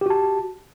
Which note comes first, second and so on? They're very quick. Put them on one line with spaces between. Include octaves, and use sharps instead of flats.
G4 F#4 A5